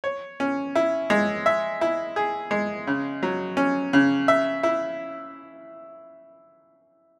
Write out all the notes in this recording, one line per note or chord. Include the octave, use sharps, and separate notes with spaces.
C#5
C#4
E4
G#3
E5
E4
G#4
G#3
C#3
F#3
C#4
C#3
E5
E4